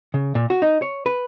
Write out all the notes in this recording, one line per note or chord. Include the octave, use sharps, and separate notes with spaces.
C#3
A#2
F#4
D#4
C#5
B4